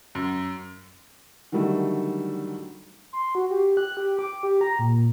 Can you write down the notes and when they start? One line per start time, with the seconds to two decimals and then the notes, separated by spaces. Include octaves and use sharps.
0.15 F#2
1.52 D3 D#3 F#3 G3 A3
3.13 C6
3.35 F#4
3.51 G4
3.77 F#6
3.97 G4
4.19 D6
4.43 G4
4.61 A#5
4.79 A#2